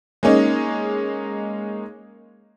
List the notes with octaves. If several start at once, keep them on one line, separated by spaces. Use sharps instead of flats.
G#3 A#3 C#4 D#4